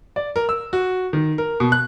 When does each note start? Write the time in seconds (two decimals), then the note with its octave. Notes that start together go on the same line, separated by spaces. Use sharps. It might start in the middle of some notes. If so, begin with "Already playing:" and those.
0.16 D5
0.36 A#4
0.49 E6
0.73 F#4
1.13 D#3
1.38 A#4
1.60 B2
1.72 F#6